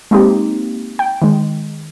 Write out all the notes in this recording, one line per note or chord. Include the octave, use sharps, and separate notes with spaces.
G#3 A#3 C4 D#4 G4
G5
D#3 G#3